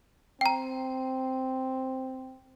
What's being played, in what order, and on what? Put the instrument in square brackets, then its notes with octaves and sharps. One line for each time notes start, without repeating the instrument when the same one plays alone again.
[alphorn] C4 [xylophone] G5 A#5